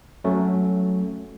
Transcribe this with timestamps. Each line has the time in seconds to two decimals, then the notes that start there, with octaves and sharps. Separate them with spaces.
0.24 F#3 A3 C#4